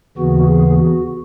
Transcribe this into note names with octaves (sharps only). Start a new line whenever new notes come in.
D#2 C#3 E3 B3 F#4
G#4
F#4